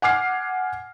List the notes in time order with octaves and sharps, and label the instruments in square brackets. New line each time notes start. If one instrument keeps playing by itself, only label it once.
[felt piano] F#5 G#5 D6 F6 C7